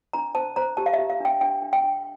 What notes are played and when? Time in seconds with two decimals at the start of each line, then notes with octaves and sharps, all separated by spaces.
0.13 D4 A#5
0.35 C5 A5
0.56 C5 A#5
0.77 G4 A5
0.86 F5
0.93 E5
0.99 G4
1.10 F5
1.20 D4 G5
1.41 D4 G5
1.62 D4
1.73 G5
1.84 D4